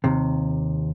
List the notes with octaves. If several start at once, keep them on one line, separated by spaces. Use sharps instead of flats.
D#2 C3